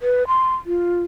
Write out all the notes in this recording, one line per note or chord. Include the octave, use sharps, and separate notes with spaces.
B4
C6
F4